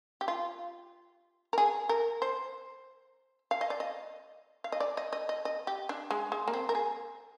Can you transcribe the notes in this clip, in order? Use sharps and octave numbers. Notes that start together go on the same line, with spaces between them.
G4
F4
A#4
G#4
A#4
C5
F5
D#5
D5
D#5
F5
D#5
D5
D#5
D#5
D#5
D#5
G4
D4
G#3
G#3
A#3
C4
A#4
G#4